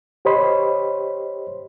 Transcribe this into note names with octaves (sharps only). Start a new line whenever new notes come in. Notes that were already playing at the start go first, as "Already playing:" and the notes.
G4 C5 C#5 D#5 B5 C6